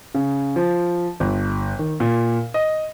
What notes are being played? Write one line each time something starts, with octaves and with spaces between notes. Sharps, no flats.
C#3
F3
G1
D#3
A#2
D#5